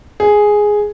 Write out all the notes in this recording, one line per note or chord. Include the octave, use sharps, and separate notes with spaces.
G#4